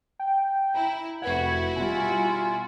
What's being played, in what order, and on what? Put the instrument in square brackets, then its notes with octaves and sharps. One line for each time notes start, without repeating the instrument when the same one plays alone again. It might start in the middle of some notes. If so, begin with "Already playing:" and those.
[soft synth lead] G5
[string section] E4 [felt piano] A#5
[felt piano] F1 B4 F#5 [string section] E4 F#4 [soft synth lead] G#6
[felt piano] B2 G3 [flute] F4 [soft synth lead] G#5